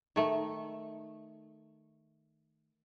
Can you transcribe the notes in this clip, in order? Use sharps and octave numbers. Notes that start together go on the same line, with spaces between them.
D#3 A3